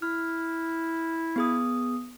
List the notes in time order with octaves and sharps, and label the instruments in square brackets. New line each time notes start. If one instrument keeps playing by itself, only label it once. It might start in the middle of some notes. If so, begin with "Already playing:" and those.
[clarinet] E4 [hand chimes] F6
[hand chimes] B3 G#4 D#6